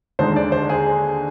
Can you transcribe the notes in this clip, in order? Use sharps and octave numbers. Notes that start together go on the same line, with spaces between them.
D#2 D3 G#3 D#4 C5
D5
C5
G#4